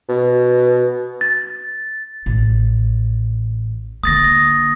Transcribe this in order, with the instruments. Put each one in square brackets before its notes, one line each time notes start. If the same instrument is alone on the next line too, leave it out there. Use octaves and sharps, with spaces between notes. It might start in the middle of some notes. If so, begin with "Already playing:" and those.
[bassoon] B2
[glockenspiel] A6
[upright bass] A1
[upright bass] D3 A#3 [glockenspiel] D#6 A6 A#6